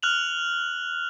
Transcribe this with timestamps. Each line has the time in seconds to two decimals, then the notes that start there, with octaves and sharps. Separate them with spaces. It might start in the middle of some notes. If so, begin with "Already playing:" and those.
0.03 F6 F#6 F7 F#7